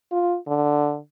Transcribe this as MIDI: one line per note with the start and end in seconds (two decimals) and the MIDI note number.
0.12 0.36 65
0.47 0.97 50